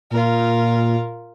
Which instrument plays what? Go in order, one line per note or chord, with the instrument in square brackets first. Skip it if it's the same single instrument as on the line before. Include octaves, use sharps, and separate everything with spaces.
[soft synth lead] A#2 [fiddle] F4 A#4